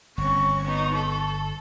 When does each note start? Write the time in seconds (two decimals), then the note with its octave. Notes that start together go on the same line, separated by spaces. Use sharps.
0.18 G1 C4 C#4 C#6
0.64 B3 D#4
0.95 A4